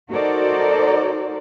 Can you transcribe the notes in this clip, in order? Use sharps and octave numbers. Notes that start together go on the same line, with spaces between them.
D#4 F#4 A4 A#4 C5 D5